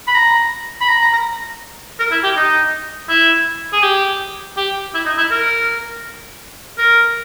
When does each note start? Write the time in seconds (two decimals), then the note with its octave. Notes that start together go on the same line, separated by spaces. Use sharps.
0.07 B5
0.15 A#5
0.81 B5
0.89 A#5
1.01 A#5
1.13 A#5
2.00 A#4
2.11 E4
2.24 G4
2.37 D#4
3.09 E4
3.73 G#4
3.83 G4
4.57 G4
4.94 E4
5.06 D#4
5.18 E4
5.31 A#4
6.78 A#4